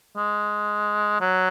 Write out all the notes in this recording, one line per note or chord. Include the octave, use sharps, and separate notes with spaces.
G#3
F#3